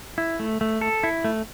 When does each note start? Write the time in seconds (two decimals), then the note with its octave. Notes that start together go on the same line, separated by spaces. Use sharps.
0.18 E4
0.40 A3
0.61 A3
0.81 A4
1.03 E4
1.24 A3